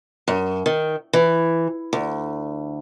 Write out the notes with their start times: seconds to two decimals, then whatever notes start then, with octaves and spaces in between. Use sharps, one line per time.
0.28 F#2
0.66 D#3
1.13 E3
1.93 D2